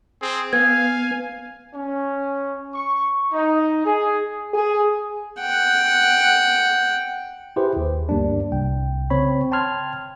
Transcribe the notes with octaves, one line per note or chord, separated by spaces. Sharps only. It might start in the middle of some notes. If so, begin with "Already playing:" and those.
C4 G#4
B3 F5 G#5 G#6
C#4
C#6
D#4
G#4
G#4
F#5 G5
E4 G4 G#4 B4 C5
D#2
D2 G2 G3 A#3 D4
C2 G5
C#3 C4 C#5 B5
G5 A5 C6 F6 G#6